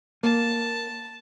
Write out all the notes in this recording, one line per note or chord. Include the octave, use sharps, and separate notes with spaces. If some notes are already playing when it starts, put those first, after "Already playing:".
A#3 A5